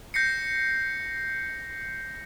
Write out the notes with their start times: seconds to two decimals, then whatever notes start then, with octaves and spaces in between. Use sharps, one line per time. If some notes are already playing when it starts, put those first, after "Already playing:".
0.14 G6 A#6 C7 C#7